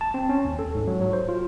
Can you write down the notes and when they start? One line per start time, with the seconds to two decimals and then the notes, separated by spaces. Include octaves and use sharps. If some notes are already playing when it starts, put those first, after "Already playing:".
0.01 A5
0.14 C4
0.29 C#4
0.45 D#2
0.59 A4
0.75 G#2
0.87 F#3
1.01 F#3
1.13 C5
1.29 F4